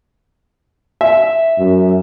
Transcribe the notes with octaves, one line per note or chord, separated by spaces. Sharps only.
E5
F#2